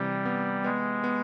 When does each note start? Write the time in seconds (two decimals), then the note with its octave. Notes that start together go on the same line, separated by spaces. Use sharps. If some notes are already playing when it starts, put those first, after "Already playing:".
Already playing: C3 E3 G3
0.25 B3
0.64 G#3 B3
1.04 B3